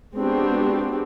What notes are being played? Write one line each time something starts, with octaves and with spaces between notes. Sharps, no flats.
G#3 B3 C4 D4 F#4 G4